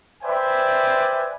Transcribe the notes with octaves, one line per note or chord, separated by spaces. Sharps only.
B4 C5 D5 E5 G5 G#5